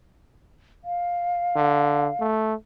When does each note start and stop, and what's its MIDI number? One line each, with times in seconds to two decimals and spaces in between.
0.84 2.26 77
1.56 2.08 50
2.20 2.54 57